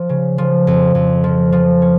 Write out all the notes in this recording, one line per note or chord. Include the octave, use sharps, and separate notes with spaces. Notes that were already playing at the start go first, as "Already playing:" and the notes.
Already playing: F3
C#3
F3
F2
F2
F3
F3
C#4